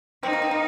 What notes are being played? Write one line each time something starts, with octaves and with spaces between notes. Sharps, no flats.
C4 D#4
A#3
C4
A#3